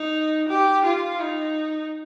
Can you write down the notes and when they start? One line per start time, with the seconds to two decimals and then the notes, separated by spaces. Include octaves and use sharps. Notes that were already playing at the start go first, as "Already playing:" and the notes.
Already playing: D#4
0.48 G4
0.85 F4
1.21 D#4